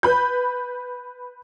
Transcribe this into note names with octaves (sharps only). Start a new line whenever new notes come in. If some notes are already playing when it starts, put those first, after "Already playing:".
B4 B5 G6